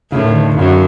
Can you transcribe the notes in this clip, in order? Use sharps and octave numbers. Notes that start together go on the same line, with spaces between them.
A2 C#3
D#3
D3
D#3
D3
F#2 C#3
D3